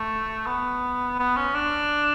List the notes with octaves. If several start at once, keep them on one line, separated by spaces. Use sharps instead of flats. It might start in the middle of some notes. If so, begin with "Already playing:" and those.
Already playing: A3
B3
B3
C#4
D4